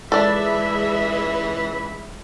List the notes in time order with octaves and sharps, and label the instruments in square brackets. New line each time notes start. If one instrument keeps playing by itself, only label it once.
[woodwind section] C#2 B5 [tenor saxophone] E3 [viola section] G#3 E5 [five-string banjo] D4 A4